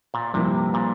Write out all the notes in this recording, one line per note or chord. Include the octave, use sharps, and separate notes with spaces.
A#2
G2 C3 F3 A#3 E4 A#4
A#2